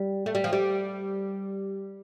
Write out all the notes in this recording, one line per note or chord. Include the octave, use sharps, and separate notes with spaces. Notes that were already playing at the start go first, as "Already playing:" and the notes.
Already playing: G3
A3
G3
F3
G3